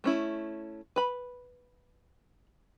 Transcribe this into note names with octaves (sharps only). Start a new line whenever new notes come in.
A3 C#4 E4
B4 B5